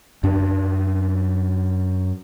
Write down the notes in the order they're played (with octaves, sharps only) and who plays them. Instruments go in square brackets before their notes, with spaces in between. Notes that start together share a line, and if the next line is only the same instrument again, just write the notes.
[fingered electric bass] F#2 D4